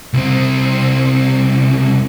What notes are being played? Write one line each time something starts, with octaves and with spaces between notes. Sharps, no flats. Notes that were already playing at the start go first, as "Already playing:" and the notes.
C2 C4